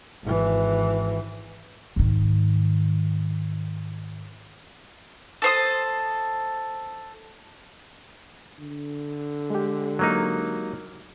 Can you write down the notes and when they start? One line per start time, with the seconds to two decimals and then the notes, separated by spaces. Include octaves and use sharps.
0.23 G#1 E3
1.96 G#2 D#3
5.42 A4 C5 D#6
8.59 D3
9.50 G#3 G4
9.99 F#3 A#3 D#4